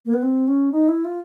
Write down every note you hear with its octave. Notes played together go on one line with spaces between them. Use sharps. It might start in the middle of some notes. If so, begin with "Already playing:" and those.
A#3
B3
C4
C#4
D#4
E4
F4